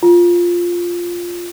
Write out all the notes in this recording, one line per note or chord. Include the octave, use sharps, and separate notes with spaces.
F4